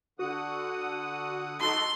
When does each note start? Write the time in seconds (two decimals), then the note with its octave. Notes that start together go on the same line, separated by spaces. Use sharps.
0.19 D3 F#4 F#5 D#6
1.60 D#4 F#4 A4 C6